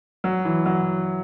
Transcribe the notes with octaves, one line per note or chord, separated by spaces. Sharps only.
F#3
E3
F#3